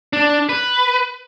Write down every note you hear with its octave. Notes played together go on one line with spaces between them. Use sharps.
D4
B4